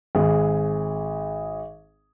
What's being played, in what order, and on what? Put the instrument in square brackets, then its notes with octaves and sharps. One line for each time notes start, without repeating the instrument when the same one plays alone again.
[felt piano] G#1 G#4